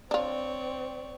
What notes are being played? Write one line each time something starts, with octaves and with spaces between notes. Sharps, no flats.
C4 D4 F4 C#5 D5